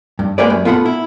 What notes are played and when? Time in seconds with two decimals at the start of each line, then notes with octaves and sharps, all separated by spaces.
0.19 G2
0.38 G#3 A#3 G4 B4 D5
0.50 F#2
0.65 B3 F4 A4 F#5 B5
0.85 E4